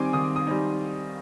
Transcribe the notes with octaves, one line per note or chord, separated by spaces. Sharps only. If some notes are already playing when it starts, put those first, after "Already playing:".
Already playing: D#3 G3 C4 D#4 G#5 C6 D6
D#3 D#6
D#6
G3 C4 D#4